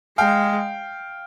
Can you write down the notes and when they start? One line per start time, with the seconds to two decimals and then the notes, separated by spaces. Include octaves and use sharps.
0.18 G#3 F5 G5